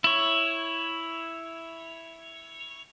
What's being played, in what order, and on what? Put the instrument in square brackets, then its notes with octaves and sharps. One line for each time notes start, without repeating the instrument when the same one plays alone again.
[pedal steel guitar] E4 C#5